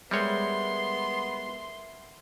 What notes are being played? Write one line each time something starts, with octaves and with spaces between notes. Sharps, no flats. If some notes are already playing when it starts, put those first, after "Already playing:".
G3 G#3 B3 A#4 C#5 E5 C6